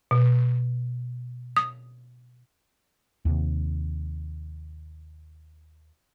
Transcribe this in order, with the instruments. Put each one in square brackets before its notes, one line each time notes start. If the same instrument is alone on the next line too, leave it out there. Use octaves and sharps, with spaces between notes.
[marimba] B2
D#6
[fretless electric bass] D#2 C3